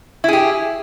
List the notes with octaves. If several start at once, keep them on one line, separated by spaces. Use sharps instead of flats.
E4 G4 G#4